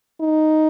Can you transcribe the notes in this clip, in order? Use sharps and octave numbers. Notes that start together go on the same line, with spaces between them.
D#4